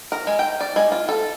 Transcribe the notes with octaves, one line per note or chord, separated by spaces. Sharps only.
A#4
G#3
G5
D5
G#3
F4
A4